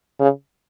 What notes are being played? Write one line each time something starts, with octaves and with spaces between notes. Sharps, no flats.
C#3